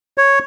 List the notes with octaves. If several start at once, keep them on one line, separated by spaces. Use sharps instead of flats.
C#5